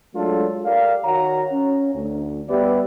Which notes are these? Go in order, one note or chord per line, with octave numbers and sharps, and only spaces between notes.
F#3 G#3 A3 D4 F4 A4
G4 A#4 D5 F5
D#3 F#4 C#5 F#5 A#5
C#4
D2
G3 B3 G4 B4 D5 E5